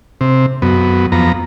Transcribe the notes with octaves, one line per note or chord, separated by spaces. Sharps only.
C3
F#2 B3
F2 B3 A#5